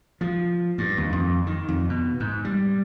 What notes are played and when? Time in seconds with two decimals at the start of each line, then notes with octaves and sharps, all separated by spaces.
0.21 F3
0.78 G2
0.98 D#2
1.12 F2
1.47 D#3
1.69 F2
1.90 B2
2.20 G#2
2.45 G3